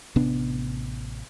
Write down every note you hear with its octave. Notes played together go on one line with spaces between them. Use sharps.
A1 C3 B3 D4